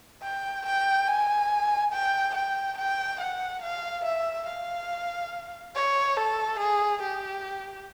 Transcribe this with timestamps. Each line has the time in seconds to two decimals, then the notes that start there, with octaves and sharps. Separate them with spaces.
0.23 G5
0.66 G5
1.08 G#5
1.93 G5
2.35 G5
2.78 G5
3.21 F#5
3.63 F5
4.05 E5
4.47 F5
5.75 C#5
6.17 A4
6.59 G#4
7.02 G4